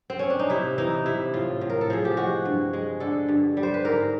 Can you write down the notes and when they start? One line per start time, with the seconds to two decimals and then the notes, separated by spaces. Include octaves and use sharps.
0.10 C4
0.19 C#4
0.30 D4
0.39 D#4
0.50 C3 E4
0.78 E3 D#4
1.06 C3 E4
1.34 A2 F4
1.61 A2
1.70 A#4
1.81 A4
1.90 F3 G#4
2.05 G4
2.17 G#3 F#4
2.45 G2
2.73 G#3
3.00 D3 A4
3.29 G2
3.57 G3
3.63 C5
3.74 B4
3.85 G#2 A#4